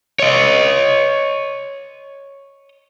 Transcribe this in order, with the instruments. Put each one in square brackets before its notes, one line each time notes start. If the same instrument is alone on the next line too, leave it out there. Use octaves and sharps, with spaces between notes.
[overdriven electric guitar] C#5 D#5